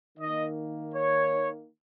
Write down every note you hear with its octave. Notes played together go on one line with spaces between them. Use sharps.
D#3 A#3 D#5
C#5